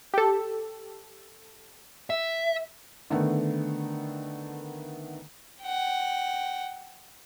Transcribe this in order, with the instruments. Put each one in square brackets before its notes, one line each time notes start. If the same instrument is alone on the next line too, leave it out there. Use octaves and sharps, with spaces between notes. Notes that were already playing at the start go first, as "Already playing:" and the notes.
[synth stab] G4 A4
[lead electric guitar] E5
[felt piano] D3 D#3 A3 B3
[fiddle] F#5 G5